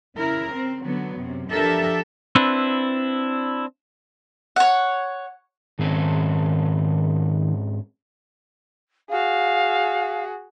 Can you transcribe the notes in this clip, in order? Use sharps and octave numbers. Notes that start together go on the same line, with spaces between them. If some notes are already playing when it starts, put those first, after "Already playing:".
C#3 E4 A#4
C4
D3 F#3 B3
F#2 C3
F3 D4 G4 A4 A#4 E5
C4 D4 E4 B4
C#5 F#5
G#2 D#3 C4 C#4
F#4 G#4 F5